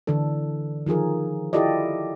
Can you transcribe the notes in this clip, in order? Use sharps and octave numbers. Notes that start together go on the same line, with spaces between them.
D3 E3 D4 A4
D#3 F3 F4 G#4 A#4
E4 F4 G4 A4 D5 D#5